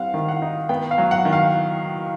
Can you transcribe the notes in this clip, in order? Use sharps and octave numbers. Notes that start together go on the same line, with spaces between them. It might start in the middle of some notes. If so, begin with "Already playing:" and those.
Already playing: G3 C4 F5 F#5
D#3
F#5
D#4
B3 G5
F5
F#3
F#5
D#3
F5